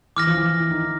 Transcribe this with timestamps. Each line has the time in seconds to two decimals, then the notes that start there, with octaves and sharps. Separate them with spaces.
0.16 E3 D6 F6 A#6
0.27 F3
0.37 E3
0.60 E3
0.71 D#3